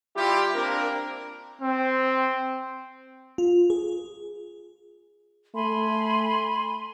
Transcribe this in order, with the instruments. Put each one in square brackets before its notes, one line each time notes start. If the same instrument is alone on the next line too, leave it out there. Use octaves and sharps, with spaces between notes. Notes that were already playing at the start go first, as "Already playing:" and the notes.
[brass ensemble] G3 E4 F4 G4
A#3 C4 D4 A#4
[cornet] C4
[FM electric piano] F4
G#4
[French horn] A3 [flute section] G#5 B5 C6